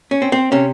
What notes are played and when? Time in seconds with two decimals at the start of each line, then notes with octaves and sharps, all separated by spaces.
0.11 C#4
0.22 C4
0.32 C4
0.52 C3 C#4